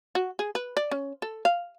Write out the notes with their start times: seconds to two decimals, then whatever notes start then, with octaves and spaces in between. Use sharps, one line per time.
0.15 F#4
0.39 G#4
0.55 B4
0.77 D5
0.91 C#4
1.22 A4
1.45 F5